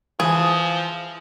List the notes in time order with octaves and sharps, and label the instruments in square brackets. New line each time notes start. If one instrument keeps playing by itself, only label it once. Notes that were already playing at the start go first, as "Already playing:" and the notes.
[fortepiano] E3 [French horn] F3 [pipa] G#4